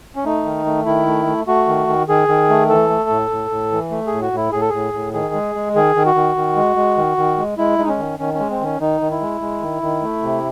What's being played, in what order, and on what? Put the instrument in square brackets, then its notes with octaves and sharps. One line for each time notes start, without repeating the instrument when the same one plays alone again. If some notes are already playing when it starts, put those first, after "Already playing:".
[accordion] C#4
A3 D#4
D#3
A3
D#3 E4
A3
A3
A3 F#4
D#3
D#3
D#3 G#4
D#3
A3
E3 A4
A3
A2
A2
A2
E3
A3
A2 G#4
F#4
A2 E4
A2 G#4
A4
A2 G#4
A2
D#3 G#4
G#3
G#3
D#3 G#4
D#3
F#4
D#3
D#3
G#3
G#3
D#3
D#3
G#3
G#3 E4
G#3 D#4
C#4
D#3
D#3 C#4
C#4
G#3
C4
D#3 C#4
D#3 D#4
D#3
E4
G#3
G#3
D#3
D#3
A3
C3